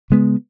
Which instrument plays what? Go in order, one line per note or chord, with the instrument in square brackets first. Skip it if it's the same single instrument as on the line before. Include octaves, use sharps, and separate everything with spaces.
[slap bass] C#3 G#3 B3